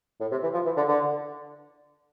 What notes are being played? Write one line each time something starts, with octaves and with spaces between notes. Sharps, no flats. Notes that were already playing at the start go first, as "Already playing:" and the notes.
A2
C3
E3
F3
E3
D3
D3